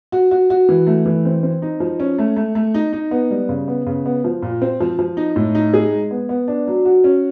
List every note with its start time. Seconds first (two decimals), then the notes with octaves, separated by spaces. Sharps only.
0.12 F#4
0.31 F#4
0.50 F#4
0.69 E3
0.87 A3
1.06 E3
1.25 C4
1.43 C4
1.62 D#4
1.80 F3
2.00 C#4
2.18 A3
2.36 A3
2.55 A3
2.74 D#4
2.93 D#4
3.11 B3
3.31 G3
3.49 C#3
3.68 B3
3.86 C#3
4.06 B3
4.24 F3
4.42 A#2
4.62 C4
4.80 F3
4.99 F3
5.17 D#4
5.36 A2
5.55 D#4
5.74 G#4
5.92 G#3
6.11 B3
6.29 B3
6.48 D4
6.67 F#3
6.85 F#4
7.04 C#4